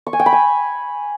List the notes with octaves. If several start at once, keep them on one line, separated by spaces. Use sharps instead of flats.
C#6
G#5
G5
B5
G#5